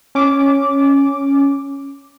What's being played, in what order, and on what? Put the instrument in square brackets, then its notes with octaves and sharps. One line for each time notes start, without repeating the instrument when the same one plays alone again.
[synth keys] C#4 D6